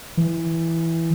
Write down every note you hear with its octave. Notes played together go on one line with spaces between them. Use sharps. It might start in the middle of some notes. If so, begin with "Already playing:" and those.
E3